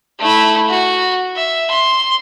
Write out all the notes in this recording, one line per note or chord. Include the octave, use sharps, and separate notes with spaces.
A3 E4
F#4
E5
C6